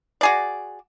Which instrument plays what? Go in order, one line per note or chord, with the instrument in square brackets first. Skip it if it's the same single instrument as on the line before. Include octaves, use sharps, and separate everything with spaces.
[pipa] F#4 G#4 D5